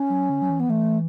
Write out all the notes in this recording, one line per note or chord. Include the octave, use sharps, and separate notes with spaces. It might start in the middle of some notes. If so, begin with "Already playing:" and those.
Already playing: C#4
F#3
D3
F#3
E3
B3
E3 A3